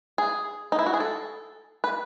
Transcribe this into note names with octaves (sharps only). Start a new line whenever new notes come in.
G#4
D#4
E4
F#4
G#4
A4
B4